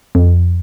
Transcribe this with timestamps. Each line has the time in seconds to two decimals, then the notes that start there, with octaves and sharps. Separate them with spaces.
0.15 F2